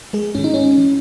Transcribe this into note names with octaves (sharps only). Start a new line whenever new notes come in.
G#3 G#4
G#2 D#3 C#4
D#4
C#4
E3